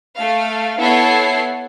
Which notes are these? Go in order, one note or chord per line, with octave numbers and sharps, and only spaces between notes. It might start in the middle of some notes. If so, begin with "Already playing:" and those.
A3 F5
B3 E4 A4 C#5 C7